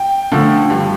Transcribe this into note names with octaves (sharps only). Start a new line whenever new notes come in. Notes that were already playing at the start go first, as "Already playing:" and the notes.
Already playing: G5
D3 F3 A3
G2